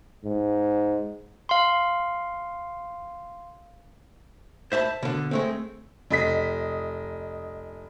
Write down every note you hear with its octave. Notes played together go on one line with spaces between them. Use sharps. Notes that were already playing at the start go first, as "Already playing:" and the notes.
G#2
F5 C6
C5 E5 A5 B5
B2 D3
G#3 A3 C4
F1 D#5 B6